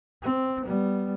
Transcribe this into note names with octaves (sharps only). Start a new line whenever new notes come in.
C4
G3 B3